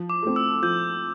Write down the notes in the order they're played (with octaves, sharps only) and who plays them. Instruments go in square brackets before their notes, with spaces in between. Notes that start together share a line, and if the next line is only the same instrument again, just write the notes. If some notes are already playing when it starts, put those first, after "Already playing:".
Already playing: [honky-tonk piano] F3
[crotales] D6
[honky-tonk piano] A3 C4
[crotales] E6
[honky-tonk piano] F3 [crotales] G6